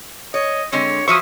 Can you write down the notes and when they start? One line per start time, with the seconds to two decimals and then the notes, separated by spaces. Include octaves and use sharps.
0.34 C#5 D#5
0.72 D3 G#3 C4 C#5
1.08 F3 F#3 C5 E5 C#6 D#6